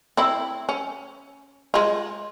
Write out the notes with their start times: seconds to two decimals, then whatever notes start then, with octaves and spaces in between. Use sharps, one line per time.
0.17 C4 E4
0.69 C#4
1.74 G#3 F4